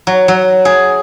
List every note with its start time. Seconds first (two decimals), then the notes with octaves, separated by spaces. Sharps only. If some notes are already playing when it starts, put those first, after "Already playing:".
0.07 F#3
0.28 F#3
0.65 G#4